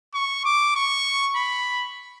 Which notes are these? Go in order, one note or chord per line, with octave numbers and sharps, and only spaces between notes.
C#6
D6
C#6
B5